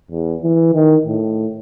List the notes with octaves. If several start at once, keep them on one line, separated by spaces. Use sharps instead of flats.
E2
E3
D#3
A2